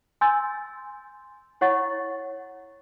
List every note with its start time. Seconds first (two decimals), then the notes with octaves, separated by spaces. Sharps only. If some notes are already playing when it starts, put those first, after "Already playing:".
0.21 G#5 C6 E6 G6 A6
1.61 E4 C#5 F#5 C#6 A6